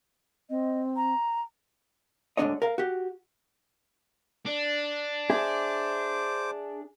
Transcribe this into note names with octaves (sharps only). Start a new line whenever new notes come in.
C4 D#5
A#5
D2 G#2 D3 D4 C#5 D#5
A#4 F5
F#4 G4
D4
G#4 C5 E5 D6